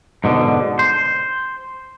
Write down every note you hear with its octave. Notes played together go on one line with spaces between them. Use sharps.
G#2 B2 D3
C5